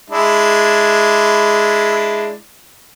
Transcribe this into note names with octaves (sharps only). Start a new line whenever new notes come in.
G#3 D4 E4